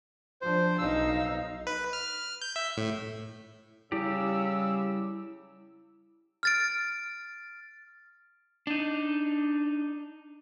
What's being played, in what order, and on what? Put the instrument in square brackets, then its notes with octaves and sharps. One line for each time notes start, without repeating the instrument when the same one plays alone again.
[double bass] F3 D4 [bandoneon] C5
[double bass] B1 [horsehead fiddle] D#4 F5 [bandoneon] E6
[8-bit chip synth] B4
F6
G6
E5
A2
[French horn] C#3 [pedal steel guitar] G3 G4 [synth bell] E4 [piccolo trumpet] E6
[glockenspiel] F6 A6 D7
[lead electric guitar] D4 D#4